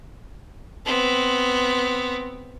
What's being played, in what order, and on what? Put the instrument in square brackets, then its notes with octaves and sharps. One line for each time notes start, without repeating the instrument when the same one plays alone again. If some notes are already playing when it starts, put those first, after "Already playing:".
[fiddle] B3 C4